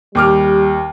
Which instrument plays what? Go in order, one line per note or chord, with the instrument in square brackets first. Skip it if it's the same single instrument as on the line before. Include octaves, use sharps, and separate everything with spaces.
[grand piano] D#2 D6 F6 [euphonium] G3